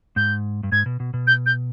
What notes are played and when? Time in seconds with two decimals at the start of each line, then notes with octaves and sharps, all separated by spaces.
0.16 G#2 G6
0.63 G2
0.72 G#2 G#6
0.86 B2
1.00 B2
1.14 B2
1.27 G6
1.46 G6